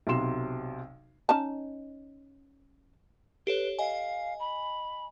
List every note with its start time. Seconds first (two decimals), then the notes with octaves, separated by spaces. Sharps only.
0.07 B1 C3 F#3 C6 E7
1.29 C#4 D#4 A5
3.47 G4 A4 B4 C#5
3.79 D#5 F5 G#5
4.39 B5